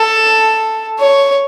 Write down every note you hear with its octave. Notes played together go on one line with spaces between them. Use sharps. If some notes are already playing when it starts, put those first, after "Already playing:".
Already playing: A4
C#5